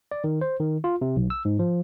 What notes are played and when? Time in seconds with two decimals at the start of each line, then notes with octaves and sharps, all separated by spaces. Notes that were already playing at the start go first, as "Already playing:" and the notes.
0.11 D5
0.24 D#3
0.41 C5
0.60 D#3
0.84 F4
1.01 C3
1.16 B1
1.30 E6
1.45 G#2
1.59 F3